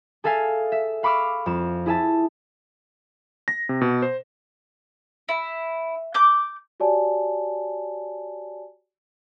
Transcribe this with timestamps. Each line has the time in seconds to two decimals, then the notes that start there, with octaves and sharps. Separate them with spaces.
0.24 G#4 A4 E5 F5 G#5
0.72 E5
1.03 F5 B5 C#6 D6 E6 F6
1.46 F2 E7
1.86 E4 G#4 E5 A5
3.48 A#6
3.69 C3
3.81 B2
4.02 C5
5.29 E4
6.14 D6 G6
6.80 F#4 G4 C#5 D5 G#5 A5